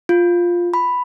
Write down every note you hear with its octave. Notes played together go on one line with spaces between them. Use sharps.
F4
B5